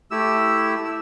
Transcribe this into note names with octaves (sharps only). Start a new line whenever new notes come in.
A3 E4 G4 E6
E6